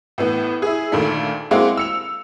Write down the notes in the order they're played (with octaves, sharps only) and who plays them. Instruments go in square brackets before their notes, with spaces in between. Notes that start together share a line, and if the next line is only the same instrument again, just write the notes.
[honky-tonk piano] A2 E3 B3
E4 G#4
D2 A#2 D#3 A3
G#3 A#3 C4 E4 F#4
E6 C#7 F7